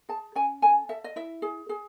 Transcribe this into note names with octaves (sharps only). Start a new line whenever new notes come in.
G#4 A5
C#4 G#5
A4 G#5
A4 E5
D#5
E4 E5
G#4
G#4